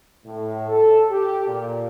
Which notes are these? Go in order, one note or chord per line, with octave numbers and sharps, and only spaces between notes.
A2
A4
G4
A#2